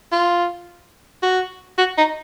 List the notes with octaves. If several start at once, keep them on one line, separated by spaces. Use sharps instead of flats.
F4
F#4
F#4
D#4